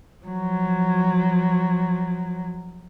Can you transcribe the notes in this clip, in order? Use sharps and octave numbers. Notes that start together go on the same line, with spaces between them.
F3 F#3